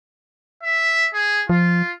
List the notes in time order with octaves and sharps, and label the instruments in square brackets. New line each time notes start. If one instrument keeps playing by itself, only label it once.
[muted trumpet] E5
G#4
[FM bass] F3 [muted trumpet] F4